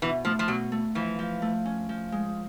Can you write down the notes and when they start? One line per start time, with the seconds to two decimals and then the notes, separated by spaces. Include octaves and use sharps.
0.02 B2 E3
0.25 F3 A3
0.39 F3
0.48 B2 F#3
0.72 A3
0.95 E3 F3
1.19 F3
1.42 A3
1.65 C#4
1.89 F3
2.12 G#3